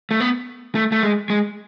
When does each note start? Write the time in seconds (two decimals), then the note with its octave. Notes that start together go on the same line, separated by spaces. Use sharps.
0.11 A3
0.20 B3
0.75 A3
0.92 A3
1.03 G#3
1.30 G#3